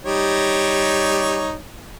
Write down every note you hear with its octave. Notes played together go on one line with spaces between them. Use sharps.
G3 D#4 C#5